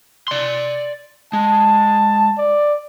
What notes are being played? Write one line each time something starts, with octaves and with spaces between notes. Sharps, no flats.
D5 C6
G#3 A5
D5